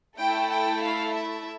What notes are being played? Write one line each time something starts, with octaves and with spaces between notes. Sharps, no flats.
A3 E4 A4 G5
G5
F5
E5